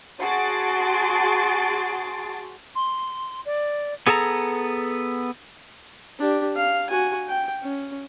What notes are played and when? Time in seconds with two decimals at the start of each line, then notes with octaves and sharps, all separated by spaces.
0.20 F#4 G#4 A5 C6 A6 D7
2.75 C6
3.45 D5
4.07 B3 G#4 A4 G#5 A#5
6.19 D4 G4
6.57 F5
6.90 F#4 G#5
7.29 G5
7.63 C#4